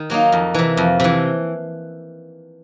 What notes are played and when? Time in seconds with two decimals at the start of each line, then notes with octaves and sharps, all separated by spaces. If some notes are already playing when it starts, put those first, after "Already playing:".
Already playing: D#3
0.10 F#3 A#3 D#4
0.32 F2
0.54 C3 E3
0.77 F2
1.00 C3 E3